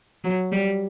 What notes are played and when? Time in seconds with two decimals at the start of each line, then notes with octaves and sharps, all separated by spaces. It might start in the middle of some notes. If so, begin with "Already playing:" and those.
0.24 F#3
0.52 G3